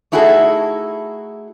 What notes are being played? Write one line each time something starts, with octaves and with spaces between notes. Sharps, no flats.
A3 D#4 E4 F#4 G#4 A4